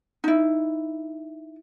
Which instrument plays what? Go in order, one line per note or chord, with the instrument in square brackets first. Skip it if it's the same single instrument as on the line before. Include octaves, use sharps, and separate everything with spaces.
[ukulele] D#4 E4